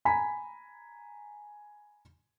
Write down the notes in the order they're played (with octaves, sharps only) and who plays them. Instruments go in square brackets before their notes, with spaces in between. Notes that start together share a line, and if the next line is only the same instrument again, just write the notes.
[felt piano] G#5 A#5 B5 B6